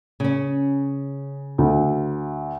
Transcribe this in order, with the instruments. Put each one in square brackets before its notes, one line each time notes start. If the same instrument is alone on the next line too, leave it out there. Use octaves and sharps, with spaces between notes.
[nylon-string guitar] C#3 C#4
[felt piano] D2